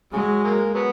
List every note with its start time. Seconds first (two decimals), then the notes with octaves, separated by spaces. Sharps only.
0.13 C#3 F#3 G#3
0.44 F#3 A#3
0.74 F#3 B3